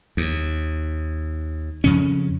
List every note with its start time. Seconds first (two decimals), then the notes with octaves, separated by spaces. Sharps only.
0.17 D#2
1.84 F2 C#3 C#4